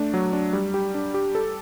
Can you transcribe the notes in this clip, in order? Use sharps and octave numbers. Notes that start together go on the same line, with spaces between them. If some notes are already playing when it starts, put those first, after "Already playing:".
Already playing: A3 D4
F#3
D4
G3
G4
D4
G4
A4